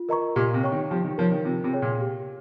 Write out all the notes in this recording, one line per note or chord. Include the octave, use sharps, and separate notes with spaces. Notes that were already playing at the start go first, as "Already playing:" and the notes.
Already playing: F4
A#4 D#5 A#5 C#6
A#2 G4
C3
C#5 G5 C#6
D#3
F3 G4
D#3
F3 A#4 C#5
D#3
C3 F4
C3
G#4 C#5 G5
A#2
G4